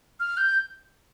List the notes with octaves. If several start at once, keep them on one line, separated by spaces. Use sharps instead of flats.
F6
G6